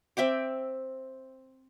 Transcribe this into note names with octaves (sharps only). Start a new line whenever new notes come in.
C4 E5 G5 D6